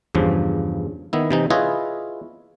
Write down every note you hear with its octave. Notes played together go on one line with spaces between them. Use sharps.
E2 G2 C#3 F3
D#3 B3 E4
C3 E3 D#4
E4 F4 G#4 B4 C#5 D#5